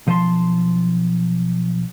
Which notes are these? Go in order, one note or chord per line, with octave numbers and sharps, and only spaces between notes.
B1 F3 B4 A5 C6